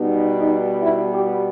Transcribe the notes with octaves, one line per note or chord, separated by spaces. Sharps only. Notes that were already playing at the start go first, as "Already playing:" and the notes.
Already playing: B2 G3 B3 D#4
D#4
E4
G4